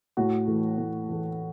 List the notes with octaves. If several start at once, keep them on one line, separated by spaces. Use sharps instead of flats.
A2 F#4
E3 A3
A2
E3 A3